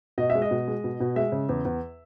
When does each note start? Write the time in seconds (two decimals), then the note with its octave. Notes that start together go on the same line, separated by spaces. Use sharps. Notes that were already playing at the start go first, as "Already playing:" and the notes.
0.18 B2 D#5
0.30 E5
0.35 G#3
0.42 D#5
0.51 B2
0.68 G#3
0.84 B2
1.00 B2
1.16 G#3 E5
1.32 C#3
1.49 E2
1.65 E2